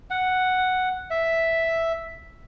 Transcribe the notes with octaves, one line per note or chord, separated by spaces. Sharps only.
F#5
E5